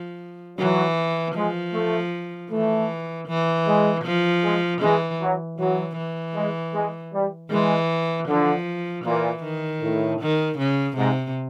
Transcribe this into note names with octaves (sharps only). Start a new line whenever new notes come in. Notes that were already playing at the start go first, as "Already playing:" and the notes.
Already playing: F3
E3 F#3
F3 G#3
A3
E3 A3
E3
G#3
F3
G#3
E3 G#3
F#3
E3 F#3
E3
G#3
G#3
G3
E3 G#3
D3 F3
A#2 E3
D#3
A2
D#3
C#3
G#2 C3